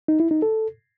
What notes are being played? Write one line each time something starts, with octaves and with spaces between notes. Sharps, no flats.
D#4
E4
D#4
A4